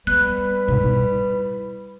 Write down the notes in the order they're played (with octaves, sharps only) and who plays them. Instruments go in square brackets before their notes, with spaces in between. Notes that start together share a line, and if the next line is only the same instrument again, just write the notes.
[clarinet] G3 [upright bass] B3 [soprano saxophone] B4 [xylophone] F#6
[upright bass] G#2 B2
E4